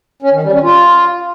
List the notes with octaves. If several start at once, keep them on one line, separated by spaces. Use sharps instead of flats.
C#4
D#3
G3
C#4
F4